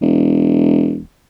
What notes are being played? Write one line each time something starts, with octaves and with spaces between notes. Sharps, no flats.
E1